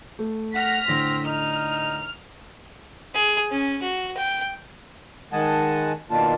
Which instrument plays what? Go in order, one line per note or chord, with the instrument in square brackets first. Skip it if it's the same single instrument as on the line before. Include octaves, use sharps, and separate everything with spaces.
[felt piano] A3
[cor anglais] F#5 [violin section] F6 A#6 B6
[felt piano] A2 D3 [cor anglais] C4
[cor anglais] D#4 [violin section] F6
[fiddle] G#4
C#4
F#4
G5
[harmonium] D#3 G#3 D#5 F#5 G#5 A5
B2 D#3 A#3 D4 F4 A5